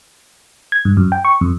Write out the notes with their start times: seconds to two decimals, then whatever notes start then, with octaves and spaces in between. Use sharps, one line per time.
0.72 G#6
0.85 G2
0.97 F#2
1.12 G5
1.25 C#6
1.41 F2